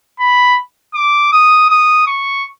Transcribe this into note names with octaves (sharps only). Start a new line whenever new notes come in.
B5
D6
D#6
D#6
C#6